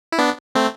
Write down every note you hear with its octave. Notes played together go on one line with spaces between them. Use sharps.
E4
B3 D4
A3 C4